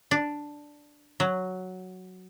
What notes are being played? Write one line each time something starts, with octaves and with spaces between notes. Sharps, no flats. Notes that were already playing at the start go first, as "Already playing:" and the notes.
D4
F#3